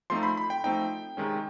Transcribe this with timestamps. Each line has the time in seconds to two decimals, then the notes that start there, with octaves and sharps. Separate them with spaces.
0.10 F3 A3 C4 D#4 C6
0.23 B5
0.37 B5
0.50 G5
0.64 F3 A3 C4 D#4 G5
1.17 C3 D#3 G#3 C#4